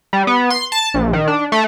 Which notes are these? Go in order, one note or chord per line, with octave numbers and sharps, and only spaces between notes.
G3
B3
C6
A5
A#1
D#3
D4
A3